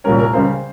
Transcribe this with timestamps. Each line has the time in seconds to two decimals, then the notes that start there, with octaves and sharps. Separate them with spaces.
0.04 C2 A#2 G3 C#4 A#4
0.19 A#4
0.33 C#2 C#3 G3 C5